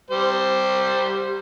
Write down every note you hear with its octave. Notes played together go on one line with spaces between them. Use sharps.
G3 C5